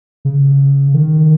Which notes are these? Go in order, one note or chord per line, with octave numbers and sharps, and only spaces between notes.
C#3
D#3